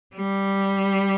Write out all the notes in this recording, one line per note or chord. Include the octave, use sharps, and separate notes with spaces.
G3